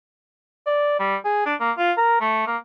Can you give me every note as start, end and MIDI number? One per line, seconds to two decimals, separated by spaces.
0.66 0.96 74
1.00 1.16 55
1.25 1.46 68
1.46 1.54 62
1.60 1.72 58
1.78 1.92 65
1.97 2.20 70
2.21 2.46 57
2.47 2.57 58